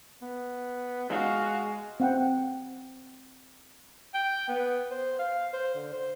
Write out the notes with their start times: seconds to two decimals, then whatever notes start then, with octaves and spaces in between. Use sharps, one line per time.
0.22 B3
1.09 G#3 F#4 F5
2.00 C4 F#5 G5
4.14 G5
4.48 B3
4.91 C5
5.19 F5
5.53 C5
5.75 D3
5.93 C5